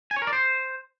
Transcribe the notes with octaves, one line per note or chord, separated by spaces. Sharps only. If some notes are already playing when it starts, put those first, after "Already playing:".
G#5
C#5
A#4
D5
C5